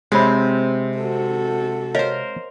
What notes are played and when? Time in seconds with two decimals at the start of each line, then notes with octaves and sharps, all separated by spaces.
0.12 C3 G#3 C4 C5 C#5 B5
0.98 F#4 A4
1.95 A#4 C5 C#5 D#5 F5